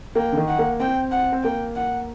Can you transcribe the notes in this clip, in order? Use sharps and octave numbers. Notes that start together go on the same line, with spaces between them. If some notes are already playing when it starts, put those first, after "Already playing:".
A#3 G5
D3
D#3
F#5
A#3
C4 G5
F#5
C4
A#3 G5
F#5